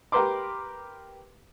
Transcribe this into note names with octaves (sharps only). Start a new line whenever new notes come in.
G4 A#4 B4 C6 D6